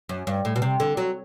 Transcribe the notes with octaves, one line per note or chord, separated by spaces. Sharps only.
F#2
G2
A2
B2
C3
D3
F#3